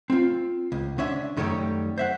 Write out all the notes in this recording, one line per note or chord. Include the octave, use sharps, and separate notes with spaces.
C4 F4
C#2
D3 C#4 D4 E5
F#2 D#3 G3 A3 C#5 G5
C5 E5 F#5